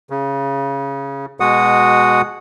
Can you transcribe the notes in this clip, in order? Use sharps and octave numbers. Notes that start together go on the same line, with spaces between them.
C#3
B2 G#3 F#4 F#5 D#6